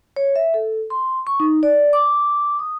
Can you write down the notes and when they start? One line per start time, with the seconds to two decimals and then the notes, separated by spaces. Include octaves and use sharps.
0.16 C#5
0.36 E5
0.54 A4
0.90 C6
1.27 C#6
1.40 D#4
1.63 D5
1.93 D6
2.59 D#6